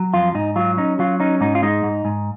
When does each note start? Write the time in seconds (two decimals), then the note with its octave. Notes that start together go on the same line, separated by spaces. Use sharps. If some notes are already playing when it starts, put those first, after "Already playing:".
Already playing: F#3
0.14 F2 F4
0.35 G#2 D#4
0.56 F#3 F4
0.77 C#4 D#4
0.99 F#3 F4
1.20 C#4 D#4
1.41 G#2 D#4
1.55 F4
1.63 G#3 D#4
1.84 G#2
2.05 G#2